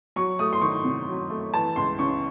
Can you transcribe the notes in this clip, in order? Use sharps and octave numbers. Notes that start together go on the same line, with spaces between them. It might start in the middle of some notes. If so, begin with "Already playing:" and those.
F#3 C#6
A3 D#6
C6
D#3 C#6
C3
F#3
A3
E3 A5
C#2 C6
C#3 C#6